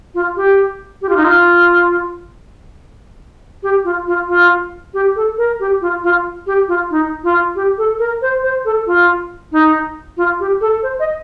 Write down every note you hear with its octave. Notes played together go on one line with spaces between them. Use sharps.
F4
G4
G4
F4
D#4
F4
G4
F4
F4
F4
G4
A4
A#4
G4
F4
F4
G4
F4
D#4
F4
G4
A4
A#4
C5
C5
A4
F4
D#4
F4
G4
A4
C5
D#5